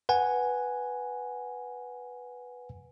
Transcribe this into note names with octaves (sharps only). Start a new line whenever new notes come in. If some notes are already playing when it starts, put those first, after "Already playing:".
B4 F#5 G#5